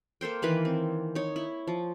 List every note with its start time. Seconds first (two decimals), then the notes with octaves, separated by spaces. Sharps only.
0.21 A#3 A4 C5 G5
0.42 D#3 E3 A#3 B4
0.65 C4
1.15 D#4 C#5
1.36 E4
1.67 F3